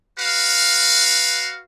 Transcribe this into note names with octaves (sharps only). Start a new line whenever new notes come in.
F#4 B4 F5